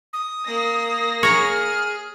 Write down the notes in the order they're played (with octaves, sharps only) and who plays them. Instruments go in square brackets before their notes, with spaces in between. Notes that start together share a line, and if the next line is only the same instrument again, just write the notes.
[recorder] D#6
[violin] A#3 A#6
[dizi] G#4 [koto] C#5 A#5 [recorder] F6